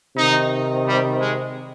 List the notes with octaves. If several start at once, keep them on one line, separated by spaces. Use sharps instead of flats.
C3 D#3 D#4
G3
G#3